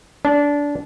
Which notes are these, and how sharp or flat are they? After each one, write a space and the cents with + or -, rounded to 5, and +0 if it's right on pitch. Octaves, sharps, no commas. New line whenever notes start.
D4 -20